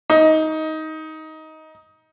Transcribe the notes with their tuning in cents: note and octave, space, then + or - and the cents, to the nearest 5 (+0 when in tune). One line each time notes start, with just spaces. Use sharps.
D#4 +15